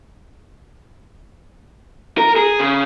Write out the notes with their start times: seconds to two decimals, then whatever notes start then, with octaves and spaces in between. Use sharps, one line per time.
2.18 A#4
2.36 G#4
2.61 C#3